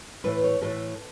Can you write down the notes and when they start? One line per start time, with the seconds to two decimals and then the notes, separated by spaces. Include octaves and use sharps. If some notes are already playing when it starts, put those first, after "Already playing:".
0.24 A2 E3 A3 B4
0.44 C#5
0.61 A2 E3 A3 A4